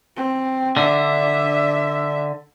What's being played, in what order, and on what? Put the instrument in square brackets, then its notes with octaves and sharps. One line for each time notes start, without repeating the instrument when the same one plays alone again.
[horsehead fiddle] C4
[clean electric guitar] D3 [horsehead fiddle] D4 E5